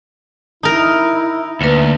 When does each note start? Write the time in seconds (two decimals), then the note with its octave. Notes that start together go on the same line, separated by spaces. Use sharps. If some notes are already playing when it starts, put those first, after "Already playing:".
0.63 D#4 E4 A#4
1.61 D2 A#3 B4